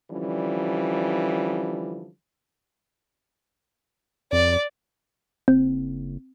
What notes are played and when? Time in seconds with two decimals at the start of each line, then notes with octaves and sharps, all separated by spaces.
0.11 D3 E3 F3 G3 C#4
4.33 F2 D5
5.48 F#1 C4